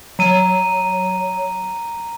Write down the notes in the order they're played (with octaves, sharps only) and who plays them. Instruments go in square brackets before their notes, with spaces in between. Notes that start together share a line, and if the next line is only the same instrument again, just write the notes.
[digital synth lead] F#3 [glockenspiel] A#5 D#7